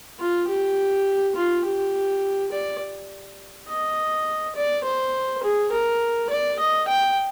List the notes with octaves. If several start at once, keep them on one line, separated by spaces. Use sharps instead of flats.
F4
G4
F4
G4
D5
D#5
D5
C5
G#4
A#4
D5
D#5
G5